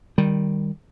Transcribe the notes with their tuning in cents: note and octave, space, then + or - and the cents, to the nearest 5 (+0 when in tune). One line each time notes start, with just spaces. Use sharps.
D#3 -5 G3 +5